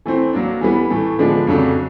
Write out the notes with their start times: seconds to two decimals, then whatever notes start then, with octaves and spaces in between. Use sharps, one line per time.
0.06 E3 A3 C4
0.33 F#3 A#3 D4
0.61 E3 G3 B3
0.90 A2 E3 A3
1.19 D3 F3 G#3 B3 D4
1.47 F2 C#3 F#3 A3 D4